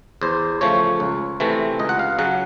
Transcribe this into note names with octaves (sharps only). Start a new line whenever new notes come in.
E2 C5
C#3 F3 A3 C#5
C#2
C3 E3 A3 C4
C#2 D#5
F#5
F5
C#3 F#3 F#5